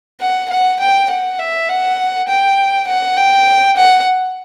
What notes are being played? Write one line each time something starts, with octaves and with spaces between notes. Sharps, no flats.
F#5
F#5
G5
F#5
E5
F#5
G5
F#5
G5
F#5